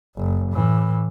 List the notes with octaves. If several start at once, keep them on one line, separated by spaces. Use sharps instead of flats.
F#1
A2 E3